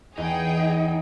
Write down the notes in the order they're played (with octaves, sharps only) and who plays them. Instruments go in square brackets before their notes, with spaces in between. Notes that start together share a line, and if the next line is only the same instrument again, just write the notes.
[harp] E2 [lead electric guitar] D#4 [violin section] G#4 G5